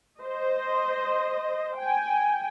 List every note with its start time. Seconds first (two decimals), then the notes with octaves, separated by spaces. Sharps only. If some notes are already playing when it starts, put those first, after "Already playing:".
0.19 C5 D#5
1.78 G5 G#5